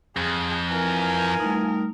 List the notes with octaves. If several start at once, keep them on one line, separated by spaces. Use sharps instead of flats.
F2 G#4
E3 F4 A#4 G#5
G3 A3 D#4